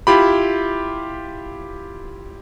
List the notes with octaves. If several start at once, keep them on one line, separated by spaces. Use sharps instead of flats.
E4 F4 G4 B5